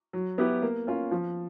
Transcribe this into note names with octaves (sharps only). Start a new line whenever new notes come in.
F#3
B3 E4 G4 B4
A#3
C#4 F4
F3